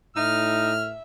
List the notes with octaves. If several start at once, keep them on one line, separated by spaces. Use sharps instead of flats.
A2 D#4 E5 F6